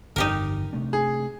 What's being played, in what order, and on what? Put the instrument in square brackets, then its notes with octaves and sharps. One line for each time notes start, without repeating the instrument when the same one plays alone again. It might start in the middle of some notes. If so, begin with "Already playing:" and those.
[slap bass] G1 F2 [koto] D#4 G4 A#4
[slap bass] C3 A3 D4
[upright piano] G#4